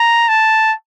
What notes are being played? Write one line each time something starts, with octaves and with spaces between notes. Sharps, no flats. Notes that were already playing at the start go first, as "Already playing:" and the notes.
Already playing: A#5
A5